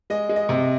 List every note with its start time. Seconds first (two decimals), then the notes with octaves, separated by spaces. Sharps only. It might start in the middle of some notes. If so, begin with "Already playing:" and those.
0.10 G#3 D#5
0.29 G#3
0.36 D#5
0.49 C3